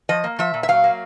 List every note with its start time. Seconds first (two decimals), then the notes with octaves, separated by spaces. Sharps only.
0.09 F3 D#5
0.24 A#3
0.39 F3 E5
0.54 A#2
0.63 E5
0.68 F#3 F5
0.84 A#3